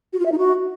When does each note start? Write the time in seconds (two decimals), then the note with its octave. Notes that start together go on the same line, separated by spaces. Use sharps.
0.13 F#4
0.19 F4
0.26 E5
0.32 D#4
0.38 F#4